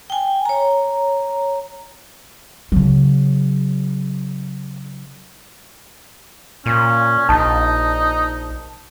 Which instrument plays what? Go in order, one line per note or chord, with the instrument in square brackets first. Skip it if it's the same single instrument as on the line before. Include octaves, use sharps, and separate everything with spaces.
[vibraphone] G5 G#5
C#5 A#5
[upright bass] C#3 F#3
[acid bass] A#2 [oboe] C#4
[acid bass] A#1 [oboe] D#4 [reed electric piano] A5